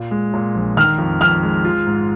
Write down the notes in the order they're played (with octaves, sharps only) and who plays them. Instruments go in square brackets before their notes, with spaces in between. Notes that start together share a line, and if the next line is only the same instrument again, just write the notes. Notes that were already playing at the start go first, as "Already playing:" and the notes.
Already playing: [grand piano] A#2
G#3
A#2
A#1
[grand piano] D#3 [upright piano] F6
[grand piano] F2
[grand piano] F2 [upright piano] F6
[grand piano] G#3
F4
G#2